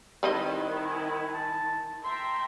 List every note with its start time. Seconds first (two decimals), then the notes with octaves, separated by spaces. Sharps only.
0.23 D#3 G3 C4 E4 B4 D#5
0.86 G#5
1.33 A5
2.04 E5 G5 A#5 C6